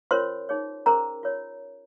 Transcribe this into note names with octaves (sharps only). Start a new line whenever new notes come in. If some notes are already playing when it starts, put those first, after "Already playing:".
C#4 F4 A#4 C5 C#5 C6
D#4 G#4 C#5
C#4 G#4 A#4 C5 A#5
F4 A#4 C#5